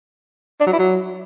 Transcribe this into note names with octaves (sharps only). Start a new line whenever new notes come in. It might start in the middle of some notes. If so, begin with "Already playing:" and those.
D4
F#3
E4
F#3